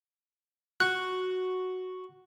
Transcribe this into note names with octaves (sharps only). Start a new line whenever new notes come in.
F#4 F#6